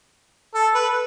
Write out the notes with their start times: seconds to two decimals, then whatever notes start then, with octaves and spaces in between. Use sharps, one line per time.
0.55 A4
0.75 B4